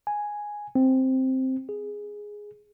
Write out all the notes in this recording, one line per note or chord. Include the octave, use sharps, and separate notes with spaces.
G#5
C4
G#4